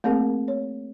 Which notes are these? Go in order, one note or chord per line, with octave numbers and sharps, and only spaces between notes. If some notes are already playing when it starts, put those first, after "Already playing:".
A3 A#3 C4 G#4 A#4
C#5